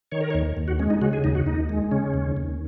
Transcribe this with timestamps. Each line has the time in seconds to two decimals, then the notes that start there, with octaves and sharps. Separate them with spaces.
0.12 D#3 C#5
0.21 A#4
0.30 C#5
0.34 D#2
0.57 D#2
0.68 F#4
0.79 G#3 C#4
0.90 D#4
1.02 C#3 F#4
1.13 G#4
1.24 D#2 D#4
1.35 F#4
1.46 D#2 D#4
1.69 G#3
1.91 C#3 C#4
2.14 D#2
2.37 D#2